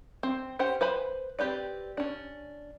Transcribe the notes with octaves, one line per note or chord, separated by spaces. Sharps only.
C4
C#4 G4 C5 F#5 G5
B4 C5 G#5 B5
C4 G4 B4 D5
C#4 D4